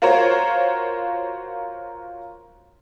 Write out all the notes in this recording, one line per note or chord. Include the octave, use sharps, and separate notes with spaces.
F4 F#4 A#4 C5 C#5